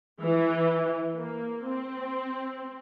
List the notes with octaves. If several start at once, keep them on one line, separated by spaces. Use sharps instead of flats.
E3
A#3
C4